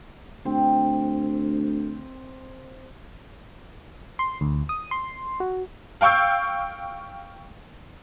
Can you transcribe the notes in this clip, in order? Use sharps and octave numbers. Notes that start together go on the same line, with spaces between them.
D2 C4
C6
D2
D#6
C6
F#4
F5 G5 C#6 E6 G6